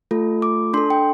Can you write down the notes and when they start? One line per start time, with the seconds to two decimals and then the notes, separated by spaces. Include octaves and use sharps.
0.11 A3 F4 A4
0.42 D6
0.74 D4 C6
0.77 A4
0.90 G5